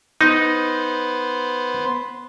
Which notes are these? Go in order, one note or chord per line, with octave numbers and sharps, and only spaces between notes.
B3 D#4 C5